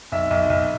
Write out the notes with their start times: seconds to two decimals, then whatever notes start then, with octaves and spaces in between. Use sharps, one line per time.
0.12 B1 E5
0.31 B1
0.50 B1